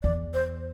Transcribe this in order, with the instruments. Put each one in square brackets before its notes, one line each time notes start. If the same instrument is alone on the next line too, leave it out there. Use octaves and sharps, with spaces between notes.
[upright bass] E2 [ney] D5
[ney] C5